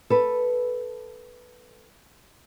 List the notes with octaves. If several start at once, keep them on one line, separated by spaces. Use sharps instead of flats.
A4 B4